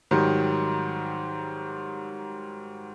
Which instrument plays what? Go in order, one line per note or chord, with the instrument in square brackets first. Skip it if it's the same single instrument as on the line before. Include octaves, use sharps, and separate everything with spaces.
[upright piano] G#2 D#3 F#3 G3